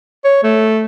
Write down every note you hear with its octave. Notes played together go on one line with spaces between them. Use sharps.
C#5
A3